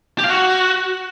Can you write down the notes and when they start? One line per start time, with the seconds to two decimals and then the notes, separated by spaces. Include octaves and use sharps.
0.18 G4
0.24 F5
0.29 F#4